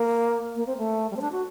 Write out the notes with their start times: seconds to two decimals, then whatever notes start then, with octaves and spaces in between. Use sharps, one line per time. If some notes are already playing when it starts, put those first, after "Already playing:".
Already playing: A#3
0.56 A#3
0.67 C4
0.78 A3
1.11 G3
1.17 C4
1.21 D4
1.32 F#4